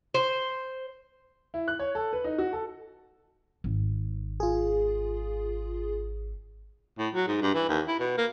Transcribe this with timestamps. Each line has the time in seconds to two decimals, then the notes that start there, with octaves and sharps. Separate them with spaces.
0.14 C5
1.54 E4
1.68 F#6
1.79 C#5
1.95 A4
2.13 B4
2.24 D#4
2.38 F#4
2.53 A4
3.64 G#1
4.40 F4 G#4
6.98 A2
7.14 F#3
7.27 G#2
7.42 G2
7.54 E3
7.69 D#2
7.88 E4
7.99 B2
8.17 A#3